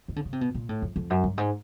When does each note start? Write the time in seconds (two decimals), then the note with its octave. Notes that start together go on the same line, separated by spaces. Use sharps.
0.08 D#3
0.16 D3
0.25 C#3
0.33 C3
0.41 B2
0.54 A#2
0.69 A2
0.82 F2
0.96 F2
1.10 F#2
1.24 G2
1.38 G#2